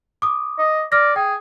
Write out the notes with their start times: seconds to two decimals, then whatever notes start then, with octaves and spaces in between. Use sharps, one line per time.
0.22 D6 D#6
0.58 D#5
0.92 D5 F6 A#6
1.16 G#4 G5